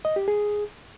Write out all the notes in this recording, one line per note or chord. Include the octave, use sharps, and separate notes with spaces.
D#5
G4
G#4